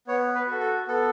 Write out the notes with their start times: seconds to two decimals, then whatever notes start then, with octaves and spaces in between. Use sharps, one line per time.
0.07 B3 C#5
0.35 B4
0.47 F#4 A4
0.60 A4
0.87 B3 A4